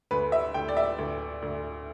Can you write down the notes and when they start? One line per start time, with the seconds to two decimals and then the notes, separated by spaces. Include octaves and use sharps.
0.11 D2 B4
0.32 E5
0.54 D2 G5
0.69 D5
0.77 E5
0.98 D2
1.42 D2